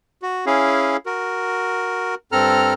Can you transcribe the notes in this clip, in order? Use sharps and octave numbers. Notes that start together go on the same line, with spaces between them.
F#4
C#4 E4 G#4 F5
F#4 A#4
G2 C4 A4 A#5 F6